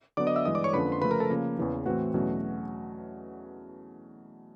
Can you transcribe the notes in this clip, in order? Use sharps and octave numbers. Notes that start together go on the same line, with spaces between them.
D3 F#3 B3 D5 D6
D#5 D#6
E5 E6
G2 E3 G#3 D#5 D#6
D5 D6
C#5 C#6
F2 D3 F3 A#3 C#4 B4 B5
C6
C#3 F3 A3 B4 B5
A#4 A#5
A4 A5
C#3 F3 A#3
E2 C#3 E3
A2 E3 A3 C4 F#4 F#5
E2 B2 F#3 A3 C#4